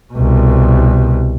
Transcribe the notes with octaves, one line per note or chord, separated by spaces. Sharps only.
C2 B2